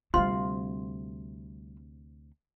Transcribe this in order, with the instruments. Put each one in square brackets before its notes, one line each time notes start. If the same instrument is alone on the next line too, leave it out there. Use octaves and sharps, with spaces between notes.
[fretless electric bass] D2 C3 [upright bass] G3 C4 [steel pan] F4 [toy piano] C6